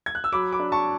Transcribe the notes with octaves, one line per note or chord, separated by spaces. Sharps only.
G#6
F#6
E6
F#3 B5 D6
B5 D6
D4
A5 C#6